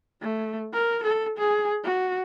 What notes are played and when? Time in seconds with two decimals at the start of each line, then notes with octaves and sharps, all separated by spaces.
0.22 A3
0.73 A#4
1.04 A4
1.38 G#4
1.84 F#4